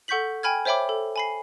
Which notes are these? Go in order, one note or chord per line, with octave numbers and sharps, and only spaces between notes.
A4 F#5 C#6 G6 B6 F#7
G5 G#5 B5 F6 G#6
C5 C#5 E5 G5 B5 D6
A4
G#5 B5 C7